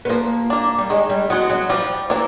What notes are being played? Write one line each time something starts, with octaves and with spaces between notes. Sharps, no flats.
B3
F3 A#3
A#3 D4
G3
D#3 G#3
G3
F#3 G#3 B3
F#3
F3 G3
E3 A#3 D4